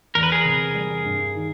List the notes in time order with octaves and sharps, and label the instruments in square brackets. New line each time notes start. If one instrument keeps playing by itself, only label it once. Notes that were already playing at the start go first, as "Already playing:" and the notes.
[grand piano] E2 [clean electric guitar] A#4
[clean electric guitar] B4
G#4 A#4
[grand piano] C3
G3
G2
D#3